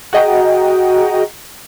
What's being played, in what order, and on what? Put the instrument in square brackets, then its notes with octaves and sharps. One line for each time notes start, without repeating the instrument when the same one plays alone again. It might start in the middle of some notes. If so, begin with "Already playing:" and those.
[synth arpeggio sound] F#4 G#4 D#5 F#5 G5 A#5